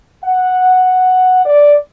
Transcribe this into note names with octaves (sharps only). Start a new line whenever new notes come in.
F#5
D5